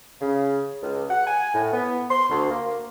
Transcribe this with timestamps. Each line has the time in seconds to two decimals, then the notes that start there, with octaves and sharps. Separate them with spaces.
0.21 C#3
0.82 C#2
1.10 F#5
1.26 G#5
1.54 A2
1.72 B3
2.10 C6
2.30 D2
2.50 A#3